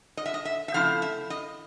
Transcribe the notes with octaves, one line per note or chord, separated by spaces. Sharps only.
D#5
E5
D#5
E5
E5
C#3 F3 A3 C4 E4 F5
E5
D#5